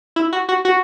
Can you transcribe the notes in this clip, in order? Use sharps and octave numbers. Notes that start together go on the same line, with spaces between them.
E4
F#4
F#4
F#4